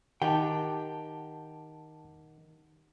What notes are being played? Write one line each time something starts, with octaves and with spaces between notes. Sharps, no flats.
D#3 G4 F#5 G5 A5